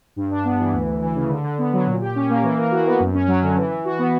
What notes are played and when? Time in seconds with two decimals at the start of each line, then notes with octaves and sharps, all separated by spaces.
0.16 G2
0.31 D4
0.44 B3
0.59 E3
0.73 D2
0.88 D2
1.02 E3
1.15 C#3
1.30 D3
1.44 D3
1.58 B3
1.73 F#3
1.87 A#2
2.01 G4
2.15 C#4
2.29 A#3
2.43 E3
2.57 A#4
2.71 F#4
2.86 B3
3.00 F#2
3.14 C#4
3.28 F#3
3.43 D3
3.56 E3
3.70 E3
3.85 F#4
3.99 B3